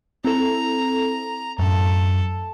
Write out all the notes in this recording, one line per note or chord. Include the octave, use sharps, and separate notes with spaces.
C4 E4 A4 A#5
F#2 A2 A4